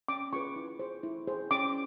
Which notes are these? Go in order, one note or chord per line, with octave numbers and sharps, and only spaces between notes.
C#4 D6
F4 G#4 B4 C#6
E4
G#4 C5
E4
G#4 C5
C#4 D6